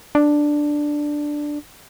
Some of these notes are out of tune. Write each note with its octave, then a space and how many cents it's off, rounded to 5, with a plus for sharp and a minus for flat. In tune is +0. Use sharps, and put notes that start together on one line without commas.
D4 +5